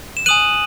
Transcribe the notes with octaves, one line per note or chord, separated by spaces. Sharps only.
E7
G#5 D#6 F#6 D#7 F#7